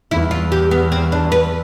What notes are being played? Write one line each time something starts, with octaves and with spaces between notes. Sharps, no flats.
E2 E4
F4
G4
B3
C4
D4
B4